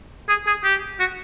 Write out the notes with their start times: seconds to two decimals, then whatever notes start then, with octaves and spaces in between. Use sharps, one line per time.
0.29 G#4
0.47 G#4
0.64 G4
1.00 F#4